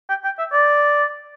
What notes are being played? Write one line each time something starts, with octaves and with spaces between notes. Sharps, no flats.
G5
G5
E5
D5